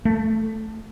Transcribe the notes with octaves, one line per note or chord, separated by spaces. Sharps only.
A3